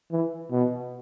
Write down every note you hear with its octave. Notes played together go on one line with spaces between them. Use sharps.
E3
B2